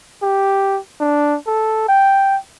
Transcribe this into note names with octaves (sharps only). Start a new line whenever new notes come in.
G4
D4
A4
G5